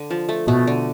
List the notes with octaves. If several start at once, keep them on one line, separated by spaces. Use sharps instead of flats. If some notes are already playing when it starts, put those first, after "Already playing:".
Already playing: D3
F3
A3
B2 A3
D3